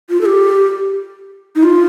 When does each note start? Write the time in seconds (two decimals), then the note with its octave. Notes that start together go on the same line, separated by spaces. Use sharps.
0.10 F4
0.21 A4
0.26 G4
1.56 D#4
1.63 F4